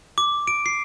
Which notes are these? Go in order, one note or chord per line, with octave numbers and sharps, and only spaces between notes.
D6
D7
C7